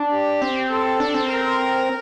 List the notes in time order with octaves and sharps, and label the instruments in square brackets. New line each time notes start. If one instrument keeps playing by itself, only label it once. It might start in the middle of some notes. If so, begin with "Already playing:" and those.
Already playing: [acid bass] D4
[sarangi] G4
[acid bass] C4
[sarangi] A4
[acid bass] D4
C4
[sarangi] A#4